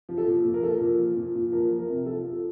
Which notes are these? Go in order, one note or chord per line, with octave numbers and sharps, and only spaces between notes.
F3
A4
A#2
A#2
A#4
F3 A4
A#4
A#2
F3
A#2
A#2
F3 A#4
F3
A#4
C3
F3 A4
F3
A4